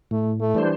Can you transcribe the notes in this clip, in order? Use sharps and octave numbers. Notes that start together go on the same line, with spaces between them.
A2 A3
A3
E3 G3 D4 C5